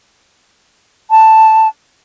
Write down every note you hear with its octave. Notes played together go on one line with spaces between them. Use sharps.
A5